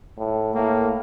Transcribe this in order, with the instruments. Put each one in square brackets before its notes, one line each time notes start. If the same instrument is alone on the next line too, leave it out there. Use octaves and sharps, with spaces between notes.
[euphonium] A2
[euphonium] A2 [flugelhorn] A#3